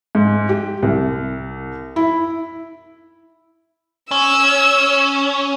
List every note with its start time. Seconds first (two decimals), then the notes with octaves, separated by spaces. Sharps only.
0.15 G#2
0.49 G4
0.82 C2
1.96 E4
4.11 C#4 E6